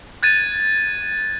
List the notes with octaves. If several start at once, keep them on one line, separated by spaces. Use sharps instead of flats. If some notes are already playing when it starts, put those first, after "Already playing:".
F#6 G#6 A6 D#7